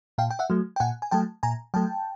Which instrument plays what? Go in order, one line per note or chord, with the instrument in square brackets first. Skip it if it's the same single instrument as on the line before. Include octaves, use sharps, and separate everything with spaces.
[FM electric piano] A#2 F5 G5
G5
E5 F#5
F#3 A3
G5
A#2 F#5 G#5
G#5
F#3 A3 G5 A5
A#2 G#5 A#5
F#3 A3 G5 A5